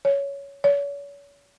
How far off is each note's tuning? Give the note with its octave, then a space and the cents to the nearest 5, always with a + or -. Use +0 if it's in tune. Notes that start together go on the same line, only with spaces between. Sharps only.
C#5 +10
C#5 +40